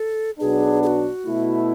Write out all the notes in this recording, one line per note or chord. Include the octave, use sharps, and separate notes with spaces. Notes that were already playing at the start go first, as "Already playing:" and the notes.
Already playing: A4
B1 B2 F#3 B3 D4 G#4
G#4
F#4
B2 A3 E4